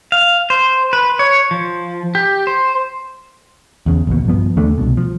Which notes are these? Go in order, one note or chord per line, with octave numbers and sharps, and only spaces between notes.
F5
C5
B4
C#5
F3
G4
C5
E2 C#3
A#1 D#2 B2
G2 F3 B3
D#2 C#3 A3 D4
C2 B2
F3